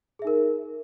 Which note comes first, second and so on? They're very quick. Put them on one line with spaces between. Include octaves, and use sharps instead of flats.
G#4 E5 D#4 A#4